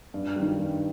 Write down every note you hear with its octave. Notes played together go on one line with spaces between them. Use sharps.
G2
D#3 G3
G2